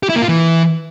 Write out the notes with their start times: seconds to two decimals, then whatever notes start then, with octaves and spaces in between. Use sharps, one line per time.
0.03 G4
0.09 E4
0.16 A#3
0.22 F4
0.28 E3